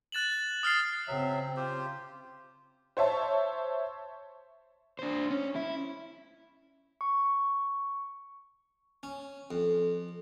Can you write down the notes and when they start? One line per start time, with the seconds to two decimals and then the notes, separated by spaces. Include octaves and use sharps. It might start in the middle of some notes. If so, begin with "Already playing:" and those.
0.12 F#6 A6 E7 F#7
0.63 D#6 F6 A6 C7
1.07 C#3 F#3 C4 E5
1.57 F4 G4 C5
2.97 C5 C#5 E5 A5
4.99 D4 C5
5.31 C#4
5.55 E4
7.01 C#6
9.03 C#4
9.51 F2